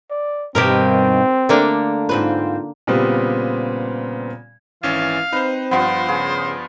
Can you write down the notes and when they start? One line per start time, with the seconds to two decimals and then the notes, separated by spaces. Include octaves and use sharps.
0.11 D5
0.55 G2 B2 D#3 C4 G4 A#4
1.49 D3 A3 A#3 D4
2.09 G#2 C4 F4 B4
2.87 A#2 C#3 G3 B3 C4
4.83 G#1 E3 C#4 F5
5.33 C4 D#4 B4 C5
5.71 G2 F3 B3 F4 C5
6.08 C#3 F4 G#4